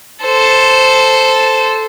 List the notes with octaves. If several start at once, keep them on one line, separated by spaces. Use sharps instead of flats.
A4 C5